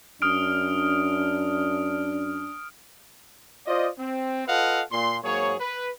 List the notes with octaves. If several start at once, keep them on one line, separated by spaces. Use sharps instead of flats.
F#2 D4 D#6 F6 D7
F4 C5 D5 D#5
C4
F4 A4 B4 D#5 F5 F#5
A#2 C6
G#2 F#3 A#3 G#4 C#5
B4